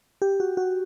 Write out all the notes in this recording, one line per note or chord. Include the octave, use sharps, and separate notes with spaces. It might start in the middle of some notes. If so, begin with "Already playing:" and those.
G4
F#4
F#4